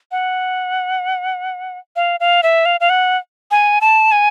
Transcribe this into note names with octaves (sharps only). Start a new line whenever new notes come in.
F#5
F5
F5
E5
F5
F5
F#5
G#5
A5
G#5